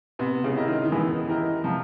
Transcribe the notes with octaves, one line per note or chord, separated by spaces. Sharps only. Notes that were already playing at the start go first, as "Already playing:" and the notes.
C3 B3
C#3
E4 G4 A#4 D#5
D#3
D#3
E3 B3
E4 G4 A#4 D#5
C3 F3